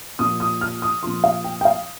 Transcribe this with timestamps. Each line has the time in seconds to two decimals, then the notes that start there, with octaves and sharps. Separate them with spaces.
0.19 A#2 F3 D#6
0.40 D#6
0.61 F6
0.82 D#6
1.03 A#2 F3 C6
1.24 F5
1.44 G5
1.61 G5
1.65 F5